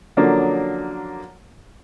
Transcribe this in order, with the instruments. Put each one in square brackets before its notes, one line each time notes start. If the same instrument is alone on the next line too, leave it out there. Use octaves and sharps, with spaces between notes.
[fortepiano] D3 F3 F#3 A#3 C#4 D4